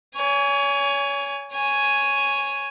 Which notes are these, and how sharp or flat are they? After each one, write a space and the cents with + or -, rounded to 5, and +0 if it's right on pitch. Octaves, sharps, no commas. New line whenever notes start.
C#5 +30 G#5 +0
C#5 +0 G#5 +0